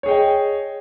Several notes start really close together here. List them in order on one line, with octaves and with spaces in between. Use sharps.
C#5 G#4 G5 D#5